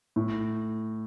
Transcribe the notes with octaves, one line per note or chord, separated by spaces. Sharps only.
A2